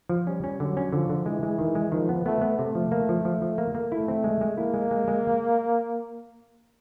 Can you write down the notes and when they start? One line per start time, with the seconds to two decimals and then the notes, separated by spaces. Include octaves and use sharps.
0.09 F3
0.27 G3 C#4
0.44 C#4
0.60 D3 F#3
0.77 C#4
0.93 D3 F3
1.10 D3
1.26 E3 G#3
1.43 G#3
1.59 D#3
1.75 G#3
1.92 D#3 F3
2.09 B3
2.25 A3 B3
2.41 B3
2.59 C3 A3
2.75 F3
2.92 A#3
3.09 F3
3.25 F3
3.42 F3
3.58 A#3
3.75 A#3
3.91 A3 E4
4.08 C4
4.24 G#3
4.41 G#3
4.57 A#3 E4
4.74 G#3
4.91 G#3
5.08 G#3